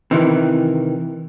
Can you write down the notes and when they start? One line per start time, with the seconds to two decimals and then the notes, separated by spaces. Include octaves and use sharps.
0.11 C3 D#3 E3